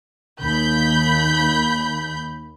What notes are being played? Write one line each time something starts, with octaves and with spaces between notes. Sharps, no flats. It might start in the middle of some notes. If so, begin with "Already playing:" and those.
D#2 B5 G6